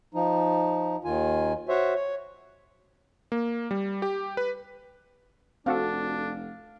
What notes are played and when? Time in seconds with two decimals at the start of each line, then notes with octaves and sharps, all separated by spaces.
0.14 F3 D#4
1.04 D#2 D#3 F4 G#5
1.69 F#4 C5 C#5 E5
1.95 C#5
3.32 A#3
3.71 G3
4.02 G4
4.37 B4
5.66 F1 C4 D4 F#4 A4 F5